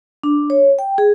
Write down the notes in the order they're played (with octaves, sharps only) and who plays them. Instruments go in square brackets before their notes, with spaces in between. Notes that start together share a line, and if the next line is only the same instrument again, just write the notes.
[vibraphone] D4
C#5
G5
G#4